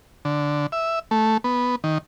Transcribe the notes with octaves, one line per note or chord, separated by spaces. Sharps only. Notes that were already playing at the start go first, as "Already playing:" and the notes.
D3
E5
A3
B3
D#3